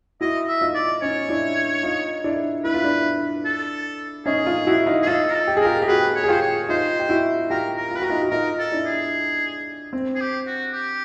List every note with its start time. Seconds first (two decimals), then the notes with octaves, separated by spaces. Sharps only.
0.21 E4 F#4 D#5
0.48 E5
0.61 D#4 F4
0.75 D5
1.02 C#4 D#4 C#5
1.29 D4 E4
1.83 D#4 F4
2.24 D4 E4
2.64 E4 B4
2.74 F4
2.84 D4 E4
3.45 A4
4.26 C#4 D#4 G#4
4.46 D#4 F4
4.67 E4 F#4
4.87 D#4 F4
5.02 G#4
5.07 D#4 F4 A4
5.30 A#4
5.34 A4
5.47 G4
5.57 G#4
5.61 F4 G4 A#4
5.82 G4
5.88 F#4 G#4 B4
6.15 C#5
6.24 G#4
6.28 F4 G4 C5
6.42 C#5
6.69 D#4 F4 C5
6.99 G4
7.09 E4 F#4
7.50 F4 G4 A#4
7.77 A#4
7.91 F4
7.96 B4
8.00 F#4 A#4
8.09 D#4 F4
8.22 F#4
8.31 D#4 F4 A#4
8.59 A4
8.72 D4 E4
8.86 G#4
9.93 C4
10.15 G#4
10.20 G4
10.47 F#4
10.74 G4